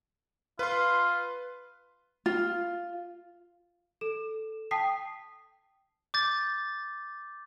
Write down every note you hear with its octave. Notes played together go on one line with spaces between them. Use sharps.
F4 B4 C6
F4
A4 E7
G5 A5 D#6 B6 C7
D6 G6 A6